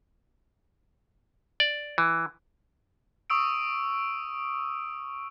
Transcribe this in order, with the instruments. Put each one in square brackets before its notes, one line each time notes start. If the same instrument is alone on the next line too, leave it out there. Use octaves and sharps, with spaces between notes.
[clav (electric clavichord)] D5
E3
[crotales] C#6 D#6 E6 D7